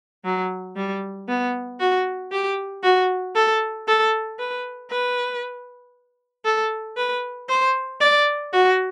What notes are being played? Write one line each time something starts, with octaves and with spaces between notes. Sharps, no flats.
F#3
G3
B3
F#4
G4
F#4
A4
A4
B4
B4
A4
B4
C5
D5
F#4